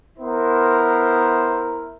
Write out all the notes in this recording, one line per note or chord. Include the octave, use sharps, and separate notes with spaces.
B3 E4 A#4 C5